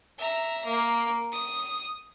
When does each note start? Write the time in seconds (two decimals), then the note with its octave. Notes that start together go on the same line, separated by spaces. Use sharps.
0.18 E5 A#5
0.65 A#3
1.32 D#6